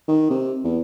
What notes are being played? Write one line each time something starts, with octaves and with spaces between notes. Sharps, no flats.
D#3
C3
E2